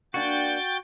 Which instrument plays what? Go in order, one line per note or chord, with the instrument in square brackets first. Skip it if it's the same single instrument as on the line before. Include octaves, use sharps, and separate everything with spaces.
[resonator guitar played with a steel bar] A#3 D4 [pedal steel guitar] F#4 [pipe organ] G5 A6